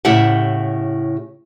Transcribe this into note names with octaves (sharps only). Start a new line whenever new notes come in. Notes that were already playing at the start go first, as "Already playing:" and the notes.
A2 C#3 E4 G4 E5 F#5